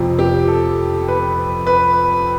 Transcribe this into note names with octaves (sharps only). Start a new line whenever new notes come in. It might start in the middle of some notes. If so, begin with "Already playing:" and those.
Already playing: F2 C3 F3
G4
A4
B4
B4